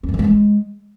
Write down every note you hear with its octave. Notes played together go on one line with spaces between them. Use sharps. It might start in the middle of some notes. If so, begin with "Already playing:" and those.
C4
G2
E3
A#3
G#3